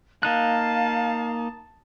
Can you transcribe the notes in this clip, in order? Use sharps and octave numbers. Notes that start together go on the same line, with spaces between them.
A#3 D#4 F5 A5 F#6